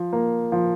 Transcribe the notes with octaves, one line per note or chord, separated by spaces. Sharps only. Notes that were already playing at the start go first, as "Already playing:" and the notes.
Already playing: F3
A#3
F3